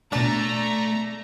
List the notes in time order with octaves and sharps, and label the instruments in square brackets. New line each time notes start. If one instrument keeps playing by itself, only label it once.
[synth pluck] B2 D4 [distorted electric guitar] A3 [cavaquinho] D5 A5 [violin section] A#5